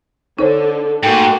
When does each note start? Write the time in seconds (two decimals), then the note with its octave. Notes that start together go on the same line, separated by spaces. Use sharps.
0.39 D3 D#4 A4 C5 C#5
1.03 G#2 A3 A#3 F#4 G5